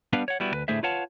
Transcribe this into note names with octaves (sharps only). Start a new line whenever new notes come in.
G3 B3 D4 B4 F5
C#5 F#5
G3 B3 E4 F#4
D2 B4
A2 D3 A3 G#4 C5 E5
F4 B4 C#5 F5 F#5 A5